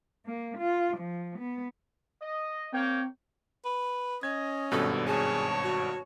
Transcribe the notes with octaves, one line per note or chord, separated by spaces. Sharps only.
A#3
F4
F3
B3
D#5
A#3 C4 C#5 G5
B4
C#4 D#5 G#6
G#1 G2 B2 A4
G#4 C#5 A5
F#4